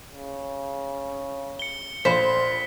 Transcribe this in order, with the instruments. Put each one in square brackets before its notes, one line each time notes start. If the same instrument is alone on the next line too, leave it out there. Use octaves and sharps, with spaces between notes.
[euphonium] C#3
[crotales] C#7 G7
[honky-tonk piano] A#1 F5 B5 [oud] C5 [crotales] B6